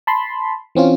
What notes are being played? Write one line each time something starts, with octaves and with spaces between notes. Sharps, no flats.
A5 B5 C6
E3 C4 C#4 F4